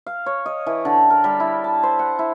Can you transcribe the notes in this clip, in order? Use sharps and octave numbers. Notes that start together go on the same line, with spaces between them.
F5
C#5
D#5
E3
D3
A#4
G3
E4
A5
C5
F#5
E4